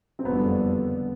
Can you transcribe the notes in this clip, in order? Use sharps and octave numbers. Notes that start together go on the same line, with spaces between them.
C4
F#1 F2 D3 G3 B3